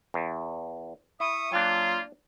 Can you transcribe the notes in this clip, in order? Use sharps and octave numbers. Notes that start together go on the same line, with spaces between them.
E2
E4 E5 C#6 D#6
F#3 A#3 D4 F4 G5